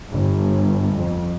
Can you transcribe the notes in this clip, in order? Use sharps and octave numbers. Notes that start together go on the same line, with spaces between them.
G1
F2